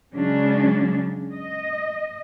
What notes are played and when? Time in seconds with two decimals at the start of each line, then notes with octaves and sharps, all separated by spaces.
0.16 C#3 F#3 G#3 C#4 D4
1.32 D#5